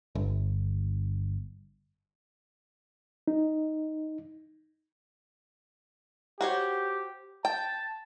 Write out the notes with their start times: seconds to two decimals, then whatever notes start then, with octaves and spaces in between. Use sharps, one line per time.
0.15 G1
3.28 D#4
6.41 F#4 G4 C5 C#5
7.45 G5 A5